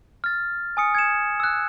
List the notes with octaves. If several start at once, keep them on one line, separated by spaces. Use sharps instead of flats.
F6 A6
G#5 D#6 C#7
G#6 C#7 E7
E6 F#6